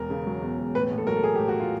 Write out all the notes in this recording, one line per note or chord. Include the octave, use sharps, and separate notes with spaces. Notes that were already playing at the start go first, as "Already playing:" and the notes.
Already playing: E1 E2 A#4
C#3
F#3
E2
E1
A2 B4
A#1
A4
F#3 A#4
A4
A3 G#4
G4
A2
F#4
F4